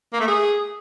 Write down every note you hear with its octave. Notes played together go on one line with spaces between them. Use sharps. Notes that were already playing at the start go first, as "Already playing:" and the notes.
A#3
A3
G#4